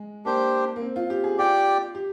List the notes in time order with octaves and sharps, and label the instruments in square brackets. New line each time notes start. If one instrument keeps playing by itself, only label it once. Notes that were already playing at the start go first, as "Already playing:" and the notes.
Already playing: [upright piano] G#3
[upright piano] A#3 [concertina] D4 G4 C5
[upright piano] A#3
C4
F4
G4
G#4
[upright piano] F4 [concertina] G4 D5 G5
[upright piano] G4